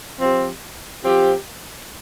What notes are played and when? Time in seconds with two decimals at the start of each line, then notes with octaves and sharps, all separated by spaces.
0.18 F3 C4 G4
1.03 F3 C4 G4